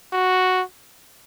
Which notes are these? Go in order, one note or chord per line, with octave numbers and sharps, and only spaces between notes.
F#4